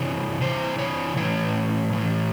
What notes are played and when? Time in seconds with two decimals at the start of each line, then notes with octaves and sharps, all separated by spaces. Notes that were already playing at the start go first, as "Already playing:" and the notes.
Already playing: C3 E3 C#5
0.41 C3 E3 C5
0.78 C#5
1.16 A2 E3 C#5
1.92 A2 E3